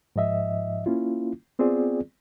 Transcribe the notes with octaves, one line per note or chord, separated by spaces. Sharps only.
G#2 F3 D#5 E5
A#3 C#4 E4 F4
B3 C4 F4 G#4 D5